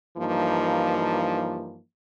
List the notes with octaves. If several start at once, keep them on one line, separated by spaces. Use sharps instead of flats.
G2 E3 F3 A#3 D#4